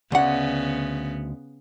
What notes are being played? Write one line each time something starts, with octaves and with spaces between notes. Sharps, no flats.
D2 C#3 B3 F#5